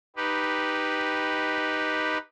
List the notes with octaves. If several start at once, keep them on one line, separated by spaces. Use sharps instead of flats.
D#4 G4 B4